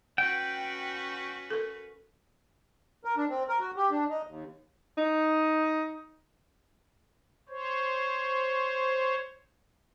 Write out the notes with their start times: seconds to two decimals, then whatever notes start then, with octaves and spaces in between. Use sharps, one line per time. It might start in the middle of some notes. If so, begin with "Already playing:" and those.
0.18 C#4 F#4 B4 F#5 G5
1.51 A4 A#4
3.05 A#4
3.17 D4
3.29 C4
3.49 A#4
3.60 F#4
3.76 G4
3.91 D4
4.10 D#4
4.27 D#2
4.98 D#4
7.49 C5 C#5